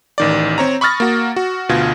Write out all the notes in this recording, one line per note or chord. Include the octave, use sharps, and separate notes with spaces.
A1 D#3 D5
C4 C#5 A#5
B5 C#6 D#6 F6 A6 A#6
A#3 F#4
F#4
D2 B2 F4 G#6